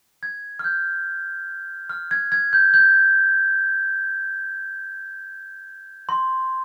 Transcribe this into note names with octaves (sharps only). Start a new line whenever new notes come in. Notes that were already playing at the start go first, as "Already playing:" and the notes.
G#6
F6
G6
F6
G#6
G#6
G6
G6
C6